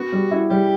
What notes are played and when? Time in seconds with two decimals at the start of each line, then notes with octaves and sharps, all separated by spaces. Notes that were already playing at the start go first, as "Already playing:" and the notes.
Already playing: B3 F#4
0.12 G3
0.31 E4
0.50 G3 G4